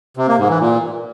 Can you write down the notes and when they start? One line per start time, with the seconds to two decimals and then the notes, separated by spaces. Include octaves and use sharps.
0.17 C3
0.28 A#3
0.39 G#2
0.49 E3
0.60 A#2